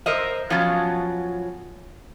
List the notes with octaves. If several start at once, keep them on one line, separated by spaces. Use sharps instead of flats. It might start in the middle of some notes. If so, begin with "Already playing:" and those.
A#4 C5 D#5 E5
F3 F#3 A3 B3 C#4 F4